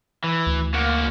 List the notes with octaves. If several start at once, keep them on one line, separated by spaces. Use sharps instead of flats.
E3
D2
A#3 F#4